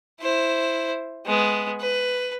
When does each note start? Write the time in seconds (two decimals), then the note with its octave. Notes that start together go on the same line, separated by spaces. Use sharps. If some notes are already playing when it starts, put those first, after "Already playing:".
0.20 E4 C5
1.26 G#3 B3
1.80 B4